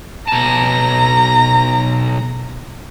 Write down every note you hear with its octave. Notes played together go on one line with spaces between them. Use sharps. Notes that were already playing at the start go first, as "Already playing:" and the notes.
B1 A5 A#5